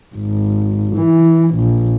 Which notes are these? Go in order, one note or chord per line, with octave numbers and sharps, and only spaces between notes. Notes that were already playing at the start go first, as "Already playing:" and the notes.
G#1
E3
A#1